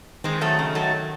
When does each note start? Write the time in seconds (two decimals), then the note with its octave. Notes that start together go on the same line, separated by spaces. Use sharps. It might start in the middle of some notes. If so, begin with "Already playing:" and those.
0.24 D#3 G#3 C4
0.41 F#3 A3
0.59 C#3
0.75 F#3 A3